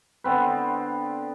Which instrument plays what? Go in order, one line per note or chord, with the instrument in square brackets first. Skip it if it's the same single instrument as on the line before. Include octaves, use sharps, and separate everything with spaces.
[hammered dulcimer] D3 B3 C4 B4